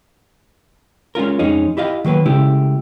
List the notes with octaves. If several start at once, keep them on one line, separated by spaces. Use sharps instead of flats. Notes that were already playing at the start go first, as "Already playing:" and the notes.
G#3 C#4 F4 A#4
F2 G#3 C#4 D#4
E4 G4 D#5 F5
D#3 F#3 A#3 B4
C#3 G#3 A3 E4 G4